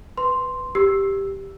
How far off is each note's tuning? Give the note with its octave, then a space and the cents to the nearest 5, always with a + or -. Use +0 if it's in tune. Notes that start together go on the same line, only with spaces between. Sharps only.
B4 +0 C6 +0
G4 +0 E6 +0